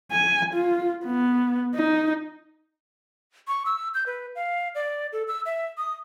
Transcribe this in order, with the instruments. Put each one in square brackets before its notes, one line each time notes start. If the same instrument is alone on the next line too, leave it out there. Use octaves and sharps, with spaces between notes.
[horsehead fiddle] G#5
F4
B3
D#4
[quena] C#6
E6
G6
B4
F5
D5
A4
E6
E5
D#6